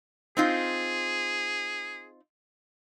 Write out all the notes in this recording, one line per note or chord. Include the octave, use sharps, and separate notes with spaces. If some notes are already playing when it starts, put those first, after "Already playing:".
C4 D#4 F4 G#4